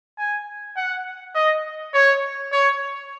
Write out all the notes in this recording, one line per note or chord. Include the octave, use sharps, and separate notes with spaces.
G#5
F#5
D#5
C#5
C#5